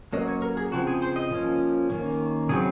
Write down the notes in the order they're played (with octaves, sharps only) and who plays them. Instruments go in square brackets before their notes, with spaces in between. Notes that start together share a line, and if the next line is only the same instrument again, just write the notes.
[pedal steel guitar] F#3 A#3 C#4 D#5
C#5
A#4
G#4
C#3 F3 C4 F#4
G#4
C5
D#5
F3 A#3 C#4
D#3 A#3 C#4
C#3 F#3 C4 G#4